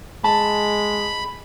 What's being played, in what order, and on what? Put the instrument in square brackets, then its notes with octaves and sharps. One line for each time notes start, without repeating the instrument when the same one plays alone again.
[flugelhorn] G#3 [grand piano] A5 [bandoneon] B5